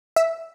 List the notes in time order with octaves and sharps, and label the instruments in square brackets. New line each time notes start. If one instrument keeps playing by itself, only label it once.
[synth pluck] E5